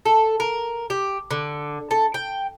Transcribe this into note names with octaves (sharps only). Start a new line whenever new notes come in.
A4
A#4
G4
D3
A4
G5